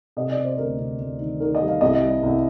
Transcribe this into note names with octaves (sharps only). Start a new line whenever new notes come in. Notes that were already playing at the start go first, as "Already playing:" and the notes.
C3 D#5
D5
C3
C5
D2 A#4
C3
D2
D#3
D#3 A#4
D#5
G3
F5
C2 D#5
G3
C2